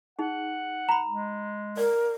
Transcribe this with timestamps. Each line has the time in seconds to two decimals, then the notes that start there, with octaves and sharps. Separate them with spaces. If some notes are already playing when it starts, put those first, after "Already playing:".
0.19 D#4 G#4 F#5
0.89 A#5 B5
1.07 G#3
1.77 A#4 D5